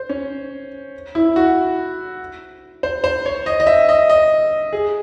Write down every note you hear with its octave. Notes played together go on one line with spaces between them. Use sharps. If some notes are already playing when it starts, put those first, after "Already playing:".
Already playing: C5
C#4
E4
F#4
C5
C5
C#5
D#5
D#5
E5
D#5
D#5
G#4